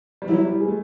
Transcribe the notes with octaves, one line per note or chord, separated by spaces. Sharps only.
G3
F#3 E4
G3
G#3
A3